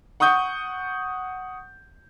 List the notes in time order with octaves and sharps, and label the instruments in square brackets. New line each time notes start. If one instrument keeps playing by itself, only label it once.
[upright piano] F#5 C#6 D#6 G6